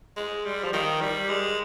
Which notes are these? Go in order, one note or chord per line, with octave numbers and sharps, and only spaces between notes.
G#3
G3
F3
D#3
G3
G#3